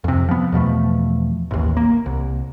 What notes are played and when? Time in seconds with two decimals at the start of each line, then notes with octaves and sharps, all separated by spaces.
0.04 F2 C3
0.29 F3 B3
0.52 E2 B2 F3 A3
1.51 A1 D#2
1.77 A#3
2.06 C2